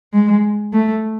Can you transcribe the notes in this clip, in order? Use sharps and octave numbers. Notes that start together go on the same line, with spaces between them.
G#3
A3